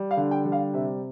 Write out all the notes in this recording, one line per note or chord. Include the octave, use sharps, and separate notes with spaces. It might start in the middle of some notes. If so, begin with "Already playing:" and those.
Already playing: G3
F5
D3
G5
G3
F5
C3 E5